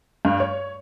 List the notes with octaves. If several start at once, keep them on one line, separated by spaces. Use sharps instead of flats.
G2
C#5